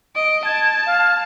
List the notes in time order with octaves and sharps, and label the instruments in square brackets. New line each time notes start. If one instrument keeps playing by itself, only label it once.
[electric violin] D#5 [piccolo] D7
[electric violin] A5 [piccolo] G#6
[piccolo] F5